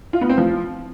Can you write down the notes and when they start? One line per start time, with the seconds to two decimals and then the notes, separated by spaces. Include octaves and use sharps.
0.13 F4
0.21 B3
0.30 C4
0.38 F3